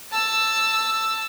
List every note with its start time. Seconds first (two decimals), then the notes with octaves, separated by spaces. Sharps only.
0.12 A5 E6